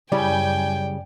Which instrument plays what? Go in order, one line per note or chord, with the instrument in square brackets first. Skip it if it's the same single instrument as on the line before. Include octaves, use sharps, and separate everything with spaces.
[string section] F#2 G#5 G6 [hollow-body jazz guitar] C#3 G3 E4 [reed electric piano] D5 [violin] G5